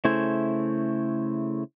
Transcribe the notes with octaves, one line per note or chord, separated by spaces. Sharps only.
C#3 A3 E4 C5 G#5